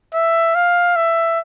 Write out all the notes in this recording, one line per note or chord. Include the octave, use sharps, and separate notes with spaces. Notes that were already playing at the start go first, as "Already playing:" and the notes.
E5
F5
E5